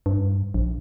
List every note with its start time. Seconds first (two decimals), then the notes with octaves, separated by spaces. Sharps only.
0.06 G2
0.54 A#1